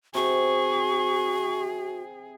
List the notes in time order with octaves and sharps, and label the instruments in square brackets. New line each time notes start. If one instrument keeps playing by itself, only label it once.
[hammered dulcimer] C3 [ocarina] F#4 [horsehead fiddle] G#4 [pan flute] C#6